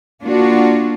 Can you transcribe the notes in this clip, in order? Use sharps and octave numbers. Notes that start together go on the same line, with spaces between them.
A#3 D4 F4 F#4